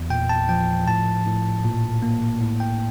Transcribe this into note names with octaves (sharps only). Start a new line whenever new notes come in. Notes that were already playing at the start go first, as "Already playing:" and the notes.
Already playing: E2
A#2 G5
A5
F3 G5
A2 A5
A2
A#2
A#3
A2
G5